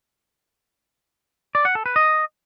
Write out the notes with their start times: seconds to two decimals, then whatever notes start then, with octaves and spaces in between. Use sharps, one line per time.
1.55 D5
1.65 F#5
1.75 A4
1.86 B4
1.96 D#5